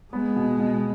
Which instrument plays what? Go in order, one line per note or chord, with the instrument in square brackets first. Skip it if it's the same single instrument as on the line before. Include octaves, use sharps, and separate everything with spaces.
[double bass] G#3 [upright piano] B3
[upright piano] B2
B2